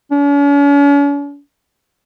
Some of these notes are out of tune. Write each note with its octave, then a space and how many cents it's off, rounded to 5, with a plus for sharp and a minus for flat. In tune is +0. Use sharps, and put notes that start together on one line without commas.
C#4 +45